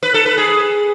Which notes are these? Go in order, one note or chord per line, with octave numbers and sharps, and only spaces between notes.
B4
A4
B4
G#4